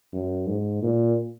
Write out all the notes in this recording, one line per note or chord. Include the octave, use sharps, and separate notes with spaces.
F#2
G#2
A#2